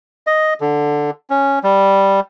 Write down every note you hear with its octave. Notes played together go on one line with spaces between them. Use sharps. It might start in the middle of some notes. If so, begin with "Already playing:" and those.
D#5
D3
C#4
G3